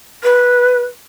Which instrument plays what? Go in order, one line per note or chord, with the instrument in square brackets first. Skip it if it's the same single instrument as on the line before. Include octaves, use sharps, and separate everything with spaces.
[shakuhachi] B4